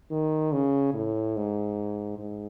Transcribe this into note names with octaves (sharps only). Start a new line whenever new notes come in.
D#3
C#3
A2
G#2
G#2